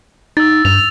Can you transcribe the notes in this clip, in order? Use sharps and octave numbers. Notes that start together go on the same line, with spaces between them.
D#4 E6 A6
G2 F7